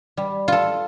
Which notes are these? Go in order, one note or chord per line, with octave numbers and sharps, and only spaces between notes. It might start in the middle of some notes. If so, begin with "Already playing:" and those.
G3
F4 A4